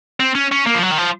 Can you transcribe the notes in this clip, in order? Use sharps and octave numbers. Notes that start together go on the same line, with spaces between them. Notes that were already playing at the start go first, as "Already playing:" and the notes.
C4
C#4
C#4
A#3
F3
F#3
D#3
F3